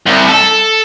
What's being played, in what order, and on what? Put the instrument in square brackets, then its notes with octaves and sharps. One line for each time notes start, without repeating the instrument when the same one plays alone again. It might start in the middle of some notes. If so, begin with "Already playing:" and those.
[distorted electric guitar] C2
A4